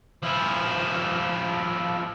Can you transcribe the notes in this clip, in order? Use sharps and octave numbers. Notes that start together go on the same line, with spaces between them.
F3 E4